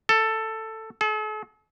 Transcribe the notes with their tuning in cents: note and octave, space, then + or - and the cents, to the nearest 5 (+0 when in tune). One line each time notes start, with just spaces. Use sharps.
A4 +10
A4 -45